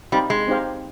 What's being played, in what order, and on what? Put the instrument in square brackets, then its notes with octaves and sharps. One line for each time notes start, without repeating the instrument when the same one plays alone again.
[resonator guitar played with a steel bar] G3 [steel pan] C4 D#4 G4 C5 F5
[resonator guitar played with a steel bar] G#3
[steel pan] C4 D#4 G4 C5 F5